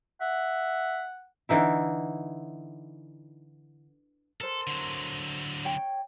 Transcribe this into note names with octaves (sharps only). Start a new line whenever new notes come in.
E5 F#5
D3 E3 D#4 E4
A4 A#4 C5
D3 F#3
C#5 G5